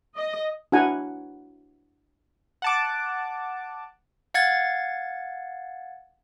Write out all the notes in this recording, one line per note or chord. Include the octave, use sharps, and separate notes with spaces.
D#5
D4 E4 F#4 F#5 G#5 A#5
F#5 A5 D6
F5 F#5 G#6 A6